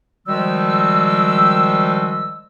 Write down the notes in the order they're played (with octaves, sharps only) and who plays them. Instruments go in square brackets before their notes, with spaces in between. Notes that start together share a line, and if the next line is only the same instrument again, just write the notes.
[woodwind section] D#3 F3 G3 G#3 F#4 E6